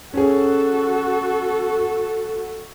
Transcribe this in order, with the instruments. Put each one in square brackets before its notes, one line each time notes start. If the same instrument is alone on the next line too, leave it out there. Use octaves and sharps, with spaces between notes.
[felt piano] C#4 G#4 [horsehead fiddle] F#4 A4